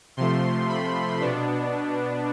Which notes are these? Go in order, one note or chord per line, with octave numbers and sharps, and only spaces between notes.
C3 F3 A3 C6
B5
B2 B3 D4